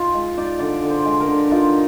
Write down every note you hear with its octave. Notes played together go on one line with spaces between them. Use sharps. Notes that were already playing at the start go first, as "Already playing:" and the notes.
Already playing: D#4 F4
G#3
D#4 D5
D3 D5
D3
C5
G#3
A#4
D3
D#4 F4